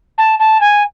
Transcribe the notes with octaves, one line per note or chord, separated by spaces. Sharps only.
A5
A5
G#5